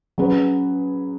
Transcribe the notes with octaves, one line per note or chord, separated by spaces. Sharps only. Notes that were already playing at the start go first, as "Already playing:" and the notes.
F#3 C#4 G#4 B4